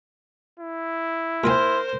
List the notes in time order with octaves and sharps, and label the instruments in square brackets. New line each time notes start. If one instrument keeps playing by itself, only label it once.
[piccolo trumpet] E4
[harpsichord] A#2 G5 G#5 [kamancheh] A#4 C5 [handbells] C6 F6